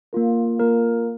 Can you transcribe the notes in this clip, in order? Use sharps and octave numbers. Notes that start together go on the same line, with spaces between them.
A#3 F4 A#4
A#3 F4 A#4